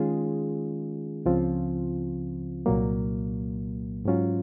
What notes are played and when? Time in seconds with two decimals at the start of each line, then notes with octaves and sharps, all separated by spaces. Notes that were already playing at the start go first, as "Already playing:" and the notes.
Already playing: D#3 G#3 C#4 F4 G#4
1.26 C#2 C#3 F3 C4 F4
2.66 C2 A#2 F#3 A#3
4.05 G#2 F#3 C#4 F4